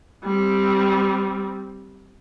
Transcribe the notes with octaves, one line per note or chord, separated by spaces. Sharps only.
G3 C4